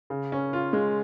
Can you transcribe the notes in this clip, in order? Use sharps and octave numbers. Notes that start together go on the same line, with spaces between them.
C#3
C#4
F4
G#3